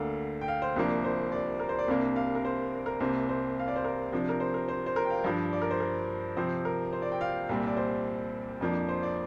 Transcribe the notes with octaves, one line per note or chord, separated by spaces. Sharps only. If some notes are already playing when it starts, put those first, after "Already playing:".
Already playing: D2 D3 A#3 F5
G5
F5
C5
C2 C3 F3 A#3 D4
C5
D5
A#4
C5
D5
C2 C3 A#3 D4 F5
F5
A#4
C5
A#4
C2 C3 A#3 C5
C5
F5
D5
C5
A#4
C3 F3 D4
A#4
C5
A#4
C5
C5
A#4
G5
F5
G2 F3 D4
D5
A#4
C5
A#4
C3 F3 C4 C5
A#4
C5
D5
G5
F5
C2 A#2 G3 C4
D5
C5
F2 F3 A#3 D4
C5
D5